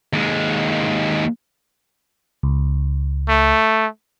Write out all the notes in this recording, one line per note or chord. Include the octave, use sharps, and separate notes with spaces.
D#2 G#3
C#2
A3